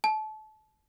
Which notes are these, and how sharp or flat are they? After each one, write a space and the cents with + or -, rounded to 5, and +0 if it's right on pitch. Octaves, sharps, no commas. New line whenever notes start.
A5 -30